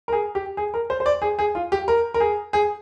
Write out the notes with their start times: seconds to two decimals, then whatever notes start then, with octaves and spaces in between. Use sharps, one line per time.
0.08 A#4
0.13 G#4
0.35 G4
0.57 G#4
0.74 A#4
0.90 C5
1.00 C5
1.06 D5
1.22 G#4
1.39 G#4
1.55 F4
1.72 G4
1.88 A#4
2.14 A#4
2.20 G#4
2.53 G#4